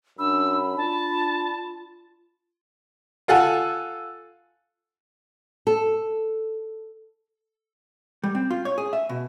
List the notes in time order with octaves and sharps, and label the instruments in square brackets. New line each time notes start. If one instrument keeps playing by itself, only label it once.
[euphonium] F#2 [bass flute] D4 [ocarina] B5 [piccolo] E6
[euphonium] D4 [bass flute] F4 [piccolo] A5
[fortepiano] F4 A4 F#5 G#5
[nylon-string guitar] A4
[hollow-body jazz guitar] G3
C4
F4
C#5
G#4
E5
B2